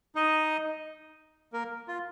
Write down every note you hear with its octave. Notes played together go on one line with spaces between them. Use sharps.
D#4 D#5
A#3 A#4
F4